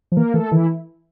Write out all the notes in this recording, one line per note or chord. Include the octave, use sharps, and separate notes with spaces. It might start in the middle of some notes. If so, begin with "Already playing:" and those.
F3
E3 A#3 A#4
E3 A3 A4
D#3 E3 E4